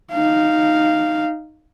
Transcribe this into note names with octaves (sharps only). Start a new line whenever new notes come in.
D#4 F5